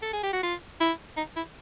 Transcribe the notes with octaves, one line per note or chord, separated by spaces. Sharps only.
A4
G#4
G4
F#4
F4
E4
D#4
E4